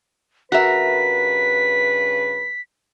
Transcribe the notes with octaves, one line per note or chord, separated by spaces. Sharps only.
G2 C#3 F#4 A#4 B4 E5 B6